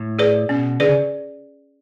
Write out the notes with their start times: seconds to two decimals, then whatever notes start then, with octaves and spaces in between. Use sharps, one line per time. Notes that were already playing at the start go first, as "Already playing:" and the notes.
Already playing: A2
0.19 G#4 B4 D5
0.49 B2 C#4
0.80 D3 G#4 B4 D5
0.88 C#3